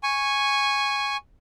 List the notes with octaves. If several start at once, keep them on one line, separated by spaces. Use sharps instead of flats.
G#5 C#6